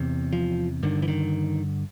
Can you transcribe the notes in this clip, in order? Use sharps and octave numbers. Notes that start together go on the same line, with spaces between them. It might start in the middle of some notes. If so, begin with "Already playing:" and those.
Already playing: E2 C3
F3
G2 D3 D#3
E3
D#3